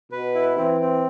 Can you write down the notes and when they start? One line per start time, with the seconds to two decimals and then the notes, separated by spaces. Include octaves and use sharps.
0.12 B2 B4
0.35 E4
0.57 E3 C4
0.80 C4